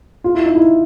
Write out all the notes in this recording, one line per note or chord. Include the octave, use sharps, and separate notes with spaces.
F4
E4
D#4
E4